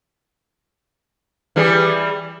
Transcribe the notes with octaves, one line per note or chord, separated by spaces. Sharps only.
E3 G3 G#4